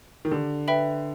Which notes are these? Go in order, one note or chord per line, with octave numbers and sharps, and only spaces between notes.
D#3
D3 G4
B4 E5 G5 B5